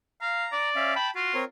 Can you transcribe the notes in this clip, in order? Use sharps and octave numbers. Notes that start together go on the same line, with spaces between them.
F5 A#5
D5
C#4 E5 F5
G5 A5 B5
F4 F#4
C4 A#4 C#5